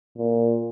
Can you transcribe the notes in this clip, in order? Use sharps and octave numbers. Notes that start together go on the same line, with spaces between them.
A#2